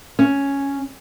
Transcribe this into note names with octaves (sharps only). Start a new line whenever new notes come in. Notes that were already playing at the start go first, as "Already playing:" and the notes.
C#4